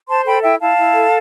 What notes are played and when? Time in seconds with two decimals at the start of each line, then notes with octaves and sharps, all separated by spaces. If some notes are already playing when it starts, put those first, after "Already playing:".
0.08 C5 A5 C6
0.25 A4 G5 B5
0.43 E4 E5 G5
0.60 E4 F5 A5
0.77 E4
0.94 A4